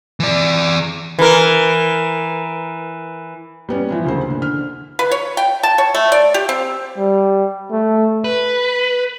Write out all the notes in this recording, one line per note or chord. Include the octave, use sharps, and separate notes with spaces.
E3 D5
E3 A#4
G3 B3 C#4
E3 F3
D2 C#3 A#3 C5
D3
D3 F6
B4
C#5
G5
A5
C#5
A3
D5
G4
C4
G3
A3
B4